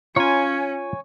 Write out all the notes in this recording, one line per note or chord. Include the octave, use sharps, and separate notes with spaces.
C#4 F4 C#5 G#5 A#5